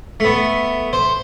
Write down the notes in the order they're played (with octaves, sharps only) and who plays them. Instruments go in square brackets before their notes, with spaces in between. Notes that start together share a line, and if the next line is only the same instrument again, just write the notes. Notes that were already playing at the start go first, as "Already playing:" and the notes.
[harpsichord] A3 B3
C5